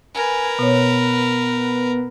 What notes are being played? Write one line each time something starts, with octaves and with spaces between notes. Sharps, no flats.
A#4 B4 G#5
B2 B3 C#5